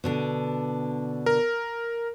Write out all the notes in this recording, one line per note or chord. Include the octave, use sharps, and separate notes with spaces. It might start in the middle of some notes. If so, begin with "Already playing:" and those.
B2 D3 D4
A#4